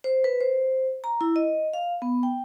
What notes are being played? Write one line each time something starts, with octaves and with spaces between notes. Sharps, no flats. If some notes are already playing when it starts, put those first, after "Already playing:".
C5
B4
C5
A#5
E4
D#5
F5
B3
G5